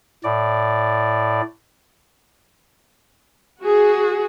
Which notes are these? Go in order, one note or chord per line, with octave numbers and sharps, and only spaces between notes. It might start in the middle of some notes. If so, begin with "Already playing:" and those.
A2 D5
F#4 G#4